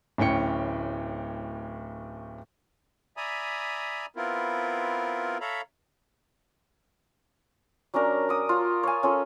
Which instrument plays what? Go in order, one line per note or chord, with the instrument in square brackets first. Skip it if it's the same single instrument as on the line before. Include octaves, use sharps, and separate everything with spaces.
[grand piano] D1 A2 C#4 G5 C#7
[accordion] D5 E5 G#5 A#5 B5 D#6
B3 C4 E4 F4 A#4
A4 C#5 E5 F5 A#5 B5
[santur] F#3 C#4 D4 A#4
D5 D#6
F4
C#5 F5 G#5
C#4 F4 A4